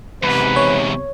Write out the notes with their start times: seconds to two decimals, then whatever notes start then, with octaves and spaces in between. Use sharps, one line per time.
0.23 E2 G#2 C3 B4
0.56 C#5